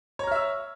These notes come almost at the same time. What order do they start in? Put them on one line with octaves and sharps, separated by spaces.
C#5 A#5 F6 E5 E6